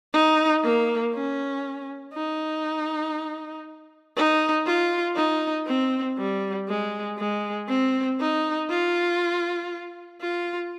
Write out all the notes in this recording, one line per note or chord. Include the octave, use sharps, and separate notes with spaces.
D#4
A#3
C#4
D#4
D#4
F4
D#4
C4
G3
G#3
G#3
C4
D#4
F4
F4